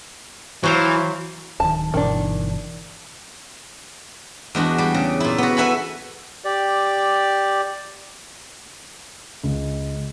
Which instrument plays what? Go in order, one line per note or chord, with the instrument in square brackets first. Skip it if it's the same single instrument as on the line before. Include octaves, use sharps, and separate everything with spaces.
[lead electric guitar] E3 [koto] F#3 C5 F5
[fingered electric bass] D1 D#3 [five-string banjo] A5
[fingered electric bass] G1 B2 E3 [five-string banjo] D#3 D4
[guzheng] E2 G#3 D4 F#4
G3 G4
C#3
A#2 E4
B3 F#4
A4 B4 E5 F#5 G#5 B5
[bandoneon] G4 D5
[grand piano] C#2